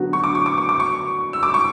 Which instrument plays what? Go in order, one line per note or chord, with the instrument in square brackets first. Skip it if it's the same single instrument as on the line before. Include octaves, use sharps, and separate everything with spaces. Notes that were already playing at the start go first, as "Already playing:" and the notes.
Already playing: [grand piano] D3 F#3 B3 F#4
[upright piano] C#6
D6
C#6
D6
C#6
D6
C#6
E6
D6
C#6